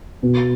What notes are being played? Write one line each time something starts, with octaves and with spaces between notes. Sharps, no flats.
B2